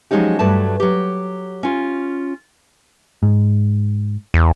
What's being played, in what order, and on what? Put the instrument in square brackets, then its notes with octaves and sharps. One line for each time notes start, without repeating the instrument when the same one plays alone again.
[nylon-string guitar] F3 F#3 G#3 C#4 D#4 G4
G2 F#3 A3 B4 A5
F#3 G4
C#4 F4
[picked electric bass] G#2
[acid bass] E2